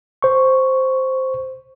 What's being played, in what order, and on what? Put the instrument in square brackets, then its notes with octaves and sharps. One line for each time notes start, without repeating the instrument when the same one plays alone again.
[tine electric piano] C5 C#6